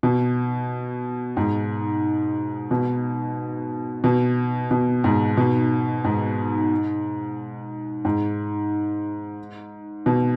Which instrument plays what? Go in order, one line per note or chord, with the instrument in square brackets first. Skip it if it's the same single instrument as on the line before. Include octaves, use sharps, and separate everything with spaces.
[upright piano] B2
G#2
B2
B2
B2
G#2
B2
G#2
G#2
B2